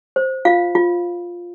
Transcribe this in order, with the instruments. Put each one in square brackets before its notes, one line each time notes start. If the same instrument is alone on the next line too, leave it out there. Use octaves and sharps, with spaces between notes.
[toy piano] C5
F4 F5
F4